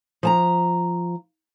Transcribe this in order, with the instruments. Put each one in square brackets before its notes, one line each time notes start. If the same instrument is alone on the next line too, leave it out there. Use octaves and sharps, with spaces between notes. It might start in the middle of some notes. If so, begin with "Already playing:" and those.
[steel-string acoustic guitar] F3 A5 A#5